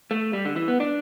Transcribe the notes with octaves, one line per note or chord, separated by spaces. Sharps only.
A3
G3
D3
E3
B3
D4